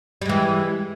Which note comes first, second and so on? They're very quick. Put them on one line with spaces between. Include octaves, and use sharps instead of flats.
G3 G#3 E3